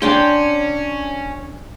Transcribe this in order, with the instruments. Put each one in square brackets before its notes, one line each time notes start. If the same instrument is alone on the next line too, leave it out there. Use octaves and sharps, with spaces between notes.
[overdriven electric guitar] C#4 [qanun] D4 G5 C6